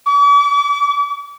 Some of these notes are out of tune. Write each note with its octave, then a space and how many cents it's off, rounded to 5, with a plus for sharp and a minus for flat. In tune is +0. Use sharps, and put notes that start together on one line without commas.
D6 -45